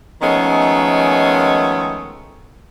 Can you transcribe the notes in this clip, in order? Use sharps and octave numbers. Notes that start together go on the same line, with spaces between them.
D#3 F3 G#3 A3 B3 C#4